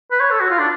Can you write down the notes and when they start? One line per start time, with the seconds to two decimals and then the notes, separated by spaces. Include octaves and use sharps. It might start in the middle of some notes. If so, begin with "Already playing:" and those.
0.12 B4
0.20 C#5
0.30 A4
0.40 F#4
0.50 F4
0.59 D4